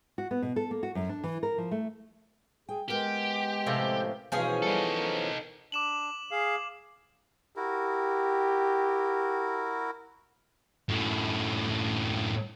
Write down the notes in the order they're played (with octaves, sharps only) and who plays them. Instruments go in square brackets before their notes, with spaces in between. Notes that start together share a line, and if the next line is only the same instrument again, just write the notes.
[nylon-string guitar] F#4
B3
B2
A4
A#3
F#4
F#2
D4
E3
A#4
F3
A3
[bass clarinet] G#4 [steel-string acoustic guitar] G5
[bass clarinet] G#3 [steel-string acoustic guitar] B3 A#4 [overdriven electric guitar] G4
[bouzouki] A2 C3 F3
[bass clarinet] B2 [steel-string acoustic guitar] E3 B3 [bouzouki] F3 C#4 G#4
[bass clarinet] G3 [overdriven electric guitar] D#4 A4
[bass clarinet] A#4
[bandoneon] D4 [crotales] D6 E7 F#7
[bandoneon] G#4 F5
[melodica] E4 F#4 A#4 [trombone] G4
[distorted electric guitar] F#2 A2